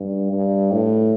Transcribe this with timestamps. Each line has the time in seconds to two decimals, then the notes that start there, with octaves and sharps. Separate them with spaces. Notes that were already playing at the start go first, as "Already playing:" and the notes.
Already playing: G2
0.32 G2
0.72 A2